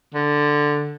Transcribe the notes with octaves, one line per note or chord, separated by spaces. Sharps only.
D3